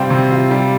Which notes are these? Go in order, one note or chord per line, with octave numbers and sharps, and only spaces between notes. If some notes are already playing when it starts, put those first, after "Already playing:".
Already playing: C3 G3 C4 F4
C3
F4
G3